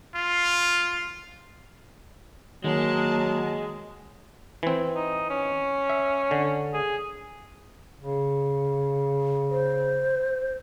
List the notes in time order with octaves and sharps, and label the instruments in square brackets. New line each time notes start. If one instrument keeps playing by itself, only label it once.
[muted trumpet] F4
[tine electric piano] D#3 [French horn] F#3 [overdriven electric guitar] G#3 [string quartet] A#3 A#4 A5
[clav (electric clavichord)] E3 C4
[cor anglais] D#4
C#4
[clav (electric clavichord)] E5
D3
[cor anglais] G#4
[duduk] C#3
[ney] C5